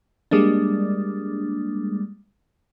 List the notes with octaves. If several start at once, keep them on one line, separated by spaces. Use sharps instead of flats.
G3 G#3 A#3 D4